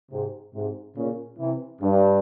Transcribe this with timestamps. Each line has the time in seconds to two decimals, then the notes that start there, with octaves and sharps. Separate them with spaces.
0.11 G#2 C3
0.54 G#2 C3
0.96 A#2 C#3
1.39 C3 E3
1.81 G2